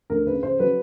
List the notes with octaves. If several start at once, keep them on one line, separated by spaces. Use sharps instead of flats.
D2 A#4
C#3 B4
C#3 C5
F#3 B4